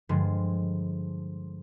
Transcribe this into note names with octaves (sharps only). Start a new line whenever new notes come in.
G2 D3 F3 G#3